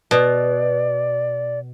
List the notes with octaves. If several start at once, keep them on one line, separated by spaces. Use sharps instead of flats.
B2 D5